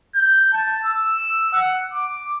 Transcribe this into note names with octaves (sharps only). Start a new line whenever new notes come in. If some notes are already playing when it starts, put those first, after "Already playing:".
G6
A5
E6
F#5
D6